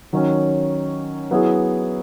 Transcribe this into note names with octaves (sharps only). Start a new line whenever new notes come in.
D#3 F#3 C#4
F#3 B3 E4 G#4